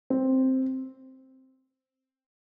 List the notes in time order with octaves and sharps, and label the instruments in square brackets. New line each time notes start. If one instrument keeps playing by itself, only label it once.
[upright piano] C4